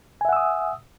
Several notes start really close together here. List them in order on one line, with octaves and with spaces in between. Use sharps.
G#5 E5 F#5 E6 D#6